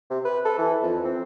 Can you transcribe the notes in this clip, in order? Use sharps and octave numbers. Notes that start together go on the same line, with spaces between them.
C3
B4
A4
E3
F2
C4